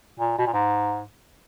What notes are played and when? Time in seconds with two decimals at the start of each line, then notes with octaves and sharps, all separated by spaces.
0.20 A#2
0.38 B2
0.47 A#2
0.53 G#2